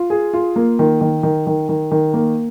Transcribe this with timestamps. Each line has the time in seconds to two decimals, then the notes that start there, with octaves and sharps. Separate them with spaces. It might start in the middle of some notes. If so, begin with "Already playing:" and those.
Already playing: F4
0.10 G#4
0.34 F4
0.56 A#3
0.79 D#3
1.01 D#3
1.23 D#3
1.47 D#3
1.69 D#3
1.91 D#3
2.13 A#3